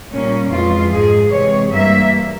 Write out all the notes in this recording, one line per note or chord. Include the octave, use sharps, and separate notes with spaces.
A#2 G3 A#3 C#4
F2 E3 G#3 F4
G#2 F3 G#3 G#4
C3 E3 G#3 C#5
G2 E3 G3 A#3 E5